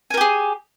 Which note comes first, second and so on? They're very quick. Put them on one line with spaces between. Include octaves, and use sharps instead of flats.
G#5 A#4 G4 G#4